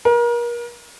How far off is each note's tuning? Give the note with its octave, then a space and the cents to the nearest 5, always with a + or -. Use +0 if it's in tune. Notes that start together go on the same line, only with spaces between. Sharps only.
A#4 +35